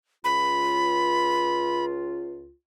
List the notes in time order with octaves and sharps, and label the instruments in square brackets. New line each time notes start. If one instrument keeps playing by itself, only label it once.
[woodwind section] C#2 F4 [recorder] B5